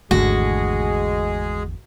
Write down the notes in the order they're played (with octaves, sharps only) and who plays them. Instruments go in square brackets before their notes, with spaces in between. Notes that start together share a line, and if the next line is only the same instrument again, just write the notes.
[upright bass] G#1 C#4 [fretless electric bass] E2 D3 A3 [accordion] G#3 G#4 [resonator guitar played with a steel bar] F#4